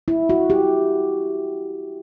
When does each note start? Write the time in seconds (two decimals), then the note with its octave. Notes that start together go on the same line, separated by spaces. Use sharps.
0.08 E4
0.30 F#4
0.50 G4